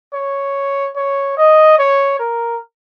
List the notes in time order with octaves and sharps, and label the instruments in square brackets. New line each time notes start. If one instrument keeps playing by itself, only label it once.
[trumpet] C#5
C#5
D#5
C#5
A#4